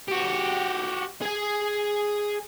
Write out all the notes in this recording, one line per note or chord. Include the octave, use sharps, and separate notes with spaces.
F#4 G4
G#4 G#5